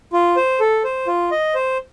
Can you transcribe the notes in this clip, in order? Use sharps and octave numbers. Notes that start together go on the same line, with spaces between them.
F4
C5
A4
C5
F4
D#5
C5